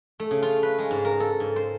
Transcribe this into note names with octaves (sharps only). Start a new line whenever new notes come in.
A3
C#3
F4
B4
G#3
G#2
A#4
A4
G#2
C5